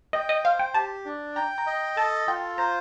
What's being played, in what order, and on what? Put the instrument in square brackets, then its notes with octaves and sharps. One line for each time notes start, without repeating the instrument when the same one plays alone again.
[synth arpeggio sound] D#5 [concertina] G5
[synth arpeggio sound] D#5
[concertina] C5 [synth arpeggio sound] F5
[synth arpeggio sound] G5
[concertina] G4 [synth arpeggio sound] A5
[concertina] D4
[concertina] G5 [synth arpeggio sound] A#5
[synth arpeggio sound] A#5
[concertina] D#5
[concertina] A4 [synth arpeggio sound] A5
[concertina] F4 [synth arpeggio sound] G5
[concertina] C5 [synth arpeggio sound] A#5